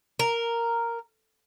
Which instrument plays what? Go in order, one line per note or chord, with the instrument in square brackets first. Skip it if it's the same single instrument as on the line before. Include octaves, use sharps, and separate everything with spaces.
[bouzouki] A#4